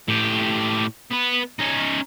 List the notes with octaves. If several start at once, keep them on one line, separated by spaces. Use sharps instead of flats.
A2 G4
B3 B4
C#4 D#4